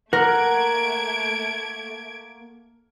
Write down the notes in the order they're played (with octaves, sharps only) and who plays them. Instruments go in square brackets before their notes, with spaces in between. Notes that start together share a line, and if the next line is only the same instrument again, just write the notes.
[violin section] A3 G#6 D7 [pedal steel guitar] A#3 F#5 [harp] A#4